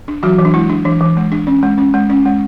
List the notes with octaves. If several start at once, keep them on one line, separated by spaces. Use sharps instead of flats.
D4
E3 F#3 F#4
E3
D4
G#3 E4
D4
E3 D4
E3
G#3
D4
C#4
G#3
C#4
G#3
C#4
G#3